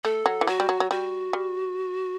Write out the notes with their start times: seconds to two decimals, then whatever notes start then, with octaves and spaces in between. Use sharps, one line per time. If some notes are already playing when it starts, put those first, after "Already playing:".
0.04 A3 A4
0.26 F#3
0.41 E3
0.47 F#3 F#4
0.60 G3
0.69 F#3
0.80 F#3
0.91 G3 F#4
1.33 G3